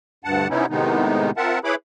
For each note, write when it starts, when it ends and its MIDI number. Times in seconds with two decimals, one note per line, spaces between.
0.24 0.48 38
0.24 0.48 43
0.24 0.48 78
0.24 0.48 81
0.50 0.66 48
0.50 0.66 59
0.50 0.66 61
0.50 0.66 63
0.50 0.66 64
0.70 1.31 45
0.70 1.31 48
0.70 1.31 51
0.70 1.31 56
0.70 1.31 59
0.70 1.31 63
1.37 1.59 60
1.37 1.59 65
1.37 1.59 70
1.37 1.59 76
1.37 1.59 78
1.37 1.59 81
1.64 1.75 64
1.64 1.75 68
1.64 1.75 71
1.64 1.75 73
1.64 1.75 83
1.64 1.75 86